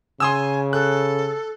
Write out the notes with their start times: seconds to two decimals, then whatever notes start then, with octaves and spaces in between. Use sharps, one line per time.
0.20 C#3 G#5 C6 D#6 E6
0.73 A4 F#6